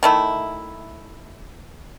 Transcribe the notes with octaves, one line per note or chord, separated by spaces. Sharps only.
D#3 A3 E4